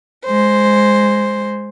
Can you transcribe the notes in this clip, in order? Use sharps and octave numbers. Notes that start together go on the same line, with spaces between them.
G#3 C5